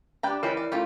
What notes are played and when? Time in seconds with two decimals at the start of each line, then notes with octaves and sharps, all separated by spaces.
0.23 D4 G4 B4 G5 A#5
0.43 E3 G#3 C#4 E4 G4 A#4 B4
0.57 D5
0.72 A3 A#3 C#4 F4 G4